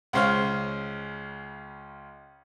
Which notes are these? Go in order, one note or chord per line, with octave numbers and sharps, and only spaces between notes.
C#2 C#3 C5 C#5 F5